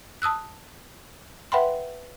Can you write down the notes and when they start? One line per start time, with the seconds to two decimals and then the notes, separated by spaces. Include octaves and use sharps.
0.22 A5 D#6 E6 F#6
1.52 B4 E5 F#5 G5 B5 C6